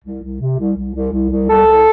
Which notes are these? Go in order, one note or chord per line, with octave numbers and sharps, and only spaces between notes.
C2
C2
C3
C2
C2
C2
C2
C2
C2 A4
C2